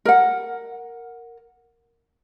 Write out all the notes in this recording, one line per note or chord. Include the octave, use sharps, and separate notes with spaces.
A#4 F#5